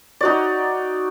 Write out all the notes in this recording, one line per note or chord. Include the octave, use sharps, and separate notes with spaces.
D#4 F#4 D5